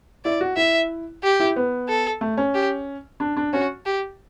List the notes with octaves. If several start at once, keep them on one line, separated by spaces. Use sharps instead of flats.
E4 D5
F#4
E4 E5
G4
E4
B3
A4
A3
C#4
G4
D4
D4
C#4 F#4
G4